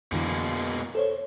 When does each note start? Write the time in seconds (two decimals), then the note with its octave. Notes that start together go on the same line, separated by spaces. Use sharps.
0.12 F2 B2 D3 E3 G#3 A#3
0.95 A4 C5 C#5